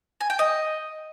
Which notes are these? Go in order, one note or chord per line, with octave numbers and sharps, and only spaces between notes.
G#5
G5
D#5